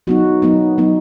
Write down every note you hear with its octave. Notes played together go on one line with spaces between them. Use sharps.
F#3 B3 D#4 F#4
F#3 B3 D#4
F#3 B3 D#4